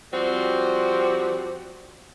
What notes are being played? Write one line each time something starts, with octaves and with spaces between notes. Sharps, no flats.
F3 G3 C4 F#4 G4